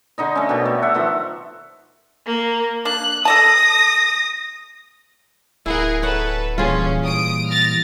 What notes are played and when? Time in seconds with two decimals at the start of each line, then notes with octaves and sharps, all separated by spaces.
0.18 D3 D#4 D#5
0.35 A3 C#4
0.49 B2 A#3 G4 D5
0.65 A3
0.82 E5 F#5
0.94 D#3 F3 A3
2.26 A#3
2.85 A#3 D4 F#6
3.25 A4 D5 A5 D#6 A#6
5.66 D1 E4 G#4 A#4 F#5
6.03 A4 B4 C#5 F#5
6.58 A#2 E3 G3 C#4 F4 G#4
7.04 D#6 D7
7.49 F6 A6 A#6